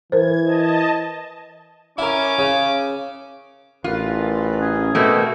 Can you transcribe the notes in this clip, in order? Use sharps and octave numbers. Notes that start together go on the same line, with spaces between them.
E3 A#4 C5 G#6
D#5 A5
C#4 E4 A#4 D6
C#3
A1 F4 A#4 B4
C#4 G#4
B2 A3 A#3 C4